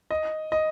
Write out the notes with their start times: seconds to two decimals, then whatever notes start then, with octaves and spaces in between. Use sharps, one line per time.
0.11 D#5
0.52 D#5